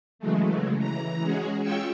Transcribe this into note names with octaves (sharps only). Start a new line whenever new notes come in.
C#3 E3 F#3 G#3 A3
E3 A#5
G#3 C#4 F#4 G#4
G#3 C#4 F4 G5 C#6 E6